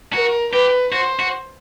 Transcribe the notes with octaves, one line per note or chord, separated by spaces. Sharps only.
F#4 A#4
G4 B4
F#4 C5
F#4